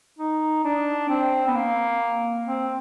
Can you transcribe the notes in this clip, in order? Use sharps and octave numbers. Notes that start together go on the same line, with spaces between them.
D#4
D4
C4
B3
A#3
C4